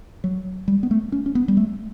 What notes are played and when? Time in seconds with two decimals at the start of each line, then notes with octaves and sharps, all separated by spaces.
0.24 F#3
0.68 G3
0.83 B3
0.91 A3
1.12 C#4
1.26 C#4
1.35 B3
1.48 G3
1.57 A3